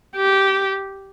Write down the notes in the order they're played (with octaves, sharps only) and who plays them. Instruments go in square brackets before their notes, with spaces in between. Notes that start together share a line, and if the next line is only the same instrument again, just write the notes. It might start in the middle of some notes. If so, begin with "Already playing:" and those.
[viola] G4